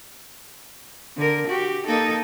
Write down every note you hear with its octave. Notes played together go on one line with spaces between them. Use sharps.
D3 A#4
F#4 G4
A#3 D#4 A4